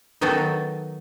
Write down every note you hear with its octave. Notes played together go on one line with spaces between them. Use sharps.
D#3 F#3 B3 D#4 A4